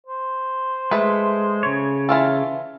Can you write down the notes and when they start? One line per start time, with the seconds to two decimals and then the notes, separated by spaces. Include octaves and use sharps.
0.07 C5
0.91 G#3 A3 B4
1.63 C#3 C#5
2.09 E3 F4 A4